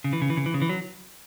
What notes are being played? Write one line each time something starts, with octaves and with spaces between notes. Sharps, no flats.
C#3
E3
C#3
E3
C#3
E3
C#3
E3
F#3